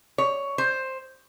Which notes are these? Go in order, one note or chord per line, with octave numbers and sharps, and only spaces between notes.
C#5
C5